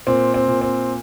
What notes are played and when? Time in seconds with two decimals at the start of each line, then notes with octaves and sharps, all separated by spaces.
0.07 A#2 C4
0.34 C4
0.48 A#2
0.61 C4